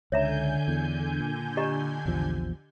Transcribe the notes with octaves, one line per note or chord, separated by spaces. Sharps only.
C#2 D3 C#5 E5 G#5 A#5 G6
E2
A#2
G4 D#5 A#5
A#1 E2 F3